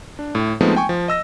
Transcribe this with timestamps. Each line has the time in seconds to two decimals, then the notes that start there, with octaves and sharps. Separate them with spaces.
0.19 D4
0.35 A2
0.61 F3 G#3 A3 B3 C4 D#4
0.76 G5 G#5 C#6
0.89 F3
1.08 D#5 E6 A#6